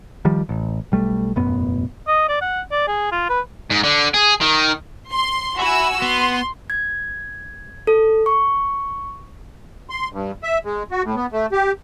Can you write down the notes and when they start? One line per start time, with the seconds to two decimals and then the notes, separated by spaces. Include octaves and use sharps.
0.25 D#3 F3 G3
0.49 A1
0.92 B1 G3 A3
1.36 E1 A1 F#2 B3
2.08 D#5
2.28 D5
2.41 F#5
2.71 D5
2.88 G#4
3.11 F4
3.29 B4
3.70 G#2
3.83 D3
4.14 G#4
4.41 D#3
5.10 C6
5.59 F#4 E5 G#5 B5 E6
6.02 B3 C6
6.70 G#6
7.87 A4
8.26 C#6
9.90 C6
10.13 G2
10.43 E5
10.65 G#3
10.91 F#4
11.04 A2
11.16 B3
11.32 A3
11.52 G4